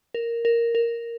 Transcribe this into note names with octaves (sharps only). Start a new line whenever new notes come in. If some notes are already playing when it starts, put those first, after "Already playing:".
A#4
A#4
A#4